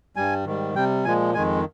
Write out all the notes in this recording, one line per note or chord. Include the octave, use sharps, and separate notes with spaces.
G2 G3 G#5
G#2 D#3 G3
C3 G3 G5
A#2 F3 G#3 G#5
F2 D#3 G#3 G#5